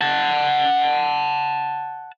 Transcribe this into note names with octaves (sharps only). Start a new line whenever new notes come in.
F#5 A5